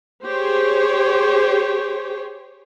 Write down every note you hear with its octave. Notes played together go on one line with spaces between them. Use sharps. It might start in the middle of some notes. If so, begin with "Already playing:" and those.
G4 G#4 C5 C#5